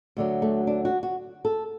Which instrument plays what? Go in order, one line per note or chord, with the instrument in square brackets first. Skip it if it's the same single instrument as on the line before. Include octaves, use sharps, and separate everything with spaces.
[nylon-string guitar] D2 D3 F#3
A3
D4
F#4
F#4
A4